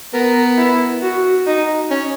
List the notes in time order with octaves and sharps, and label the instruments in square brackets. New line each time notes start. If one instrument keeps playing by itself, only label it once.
[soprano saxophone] B3 [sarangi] A#4
[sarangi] E4
F#4
D#4
[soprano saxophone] C#4